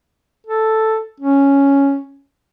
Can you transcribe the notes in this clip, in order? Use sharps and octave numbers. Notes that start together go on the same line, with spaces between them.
A4
C#4